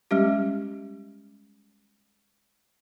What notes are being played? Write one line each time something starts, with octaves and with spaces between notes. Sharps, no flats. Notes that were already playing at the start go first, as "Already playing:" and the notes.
G3 G#3 C#4 G4